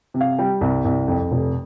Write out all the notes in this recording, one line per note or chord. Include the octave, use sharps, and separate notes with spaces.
C3
F5
G3 G5
C2
C2
F2
F1